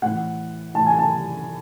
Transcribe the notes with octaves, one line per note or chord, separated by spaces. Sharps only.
A2 E3 F#5
A2 E3 A5
G#5
A5